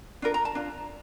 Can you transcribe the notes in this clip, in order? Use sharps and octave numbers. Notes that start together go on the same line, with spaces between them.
D4 F4 A#4
A#5
A5
D4 F4